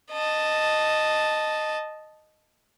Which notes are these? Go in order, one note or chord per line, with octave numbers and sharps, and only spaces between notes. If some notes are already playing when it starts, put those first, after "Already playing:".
D#5 A5